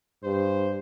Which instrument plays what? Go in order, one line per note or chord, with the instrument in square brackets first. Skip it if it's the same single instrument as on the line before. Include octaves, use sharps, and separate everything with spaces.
[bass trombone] G2 [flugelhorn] C5